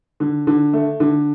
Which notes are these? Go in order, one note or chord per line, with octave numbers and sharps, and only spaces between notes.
D3
D3
A3
D3